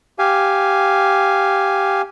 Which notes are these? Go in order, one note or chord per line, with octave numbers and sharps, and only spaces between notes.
G4 F5 G#5